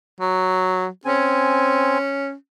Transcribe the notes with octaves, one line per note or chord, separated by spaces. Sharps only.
F#3
C4 C#4 G#5